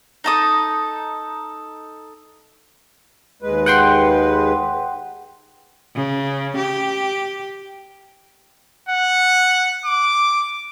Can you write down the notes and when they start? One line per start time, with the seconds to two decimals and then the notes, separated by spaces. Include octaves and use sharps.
0.24 D#4 A4 D#6
3.42 D#2 G#3 B4
3.66 F#5 G5 C6
5.95 C#3
6.57 G4
8.89 F#5
9.86 D6